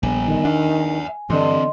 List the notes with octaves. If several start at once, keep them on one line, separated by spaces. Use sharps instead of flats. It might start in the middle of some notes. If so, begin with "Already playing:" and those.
A#1 G3 B3 G#5
D#3
D4 E5 F#5
G2 D3 E3 C4 D#5 C6